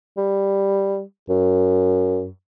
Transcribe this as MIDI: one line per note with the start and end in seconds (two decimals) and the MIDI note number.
0.17 1.02 55
1.29 2.28 42